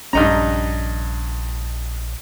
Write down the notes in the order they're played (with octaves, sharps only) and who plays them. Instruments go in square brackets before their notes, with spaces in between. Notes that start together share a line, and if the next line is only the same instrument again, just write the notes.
[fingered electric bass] A#1 C#4 [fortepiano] G2 D#4 A#5